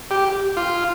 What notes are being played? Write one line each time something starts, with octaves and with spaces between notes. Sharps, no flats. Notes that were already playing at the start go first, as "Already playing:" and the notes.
G4
F4